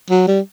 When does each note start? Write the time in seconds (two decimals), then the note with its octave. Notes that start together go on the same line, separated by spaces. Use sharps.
0.10 F#3
0.28 G3